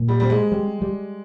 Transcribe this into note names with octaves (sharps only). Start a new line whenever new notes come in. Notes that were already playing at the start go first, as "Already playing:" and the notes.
Already playing: A#2
G3
G3 C4
G#3
G3
G3